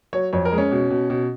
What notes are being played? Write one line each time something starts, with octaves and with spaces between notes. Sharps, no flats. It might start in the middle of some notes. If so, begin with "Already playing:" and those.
F#3 C#5
F2 C#5
A#4
G#3
C#4
B2
B2
B2